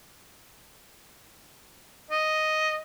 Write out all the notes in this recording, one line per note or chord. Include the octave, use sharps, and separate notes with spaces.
D#5